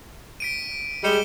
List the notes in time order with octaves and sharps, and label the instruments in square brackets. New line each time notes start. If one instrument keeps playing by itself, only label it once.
[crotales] B6 D7 D#7
[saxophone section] G3 G#3 [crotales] C#7 E7 G7